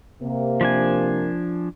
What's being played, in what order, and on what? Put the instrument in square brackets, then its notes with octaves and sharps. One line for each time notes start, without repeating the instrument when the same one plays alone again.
[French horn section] C3 A#3
[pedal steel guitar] F3 D4 G#5